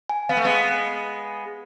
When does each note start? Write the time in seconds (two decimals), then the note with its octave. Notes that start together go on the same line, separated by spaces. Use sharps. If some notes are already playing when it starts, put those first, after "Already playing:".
0.09 G#5
0.29 B3 F5
0.37 A3
0.44 G#3 B3